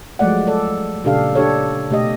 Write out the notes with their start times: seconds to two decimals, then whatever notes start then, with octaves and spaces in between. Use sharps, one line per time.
0.19 F3 F#3 G#3 A3 D5 F#5
0.47 A4 D5
1.04 A#2 C#3 D4 G4 A4 F5
1.35 D4 G4 A4 C#5
1.91 B2 A3 G4 D#5